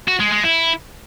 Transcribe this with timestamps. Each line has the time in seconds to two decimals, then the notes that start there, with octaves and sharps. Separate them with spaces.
0.08 F#4
0.20 G#3
0.32 G#3
0.44 E4